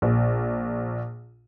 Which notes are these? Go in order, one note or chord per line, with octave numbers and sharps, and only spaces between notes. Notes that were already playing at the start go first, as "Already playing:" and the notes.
A#1